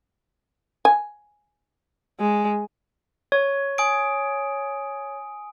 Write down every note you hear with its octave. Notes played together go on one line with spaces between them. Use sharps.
G#5
G#3
C#5
G#5 D#6 D7